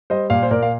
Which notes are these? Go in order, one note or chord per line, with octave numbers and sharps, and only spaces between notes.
G3 C5 D#5
A#2 D5 F5
C5
A#2 A#4 D5
F5